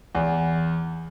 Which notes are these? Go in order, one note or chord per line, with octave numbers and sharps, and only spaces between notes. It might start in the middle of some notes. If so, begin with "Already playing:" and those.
E2